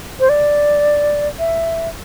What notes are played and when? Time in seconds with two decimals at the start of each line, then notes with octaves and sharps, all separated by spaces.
0.20 C5
0.29 D5
1.39 E5